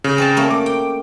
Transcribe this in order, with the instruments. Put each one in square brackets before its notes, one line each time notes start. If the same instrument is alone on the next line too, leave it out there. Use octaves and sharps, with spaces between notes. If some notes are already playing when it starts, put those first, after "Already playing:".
[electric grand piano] C#3
[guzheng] C4 D5 A5
A3 A#3 C#4
[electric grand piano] D6
[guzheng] G5